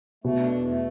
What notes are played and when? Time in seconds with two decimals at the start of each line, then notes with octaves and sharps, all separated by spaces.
0.24 B2 A3
0.39 D4
0.54 E2
0.68 A3